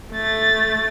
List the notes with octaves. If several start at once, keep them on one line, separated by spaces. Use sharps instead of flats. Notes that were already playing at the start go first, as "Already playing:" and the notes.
A3 A6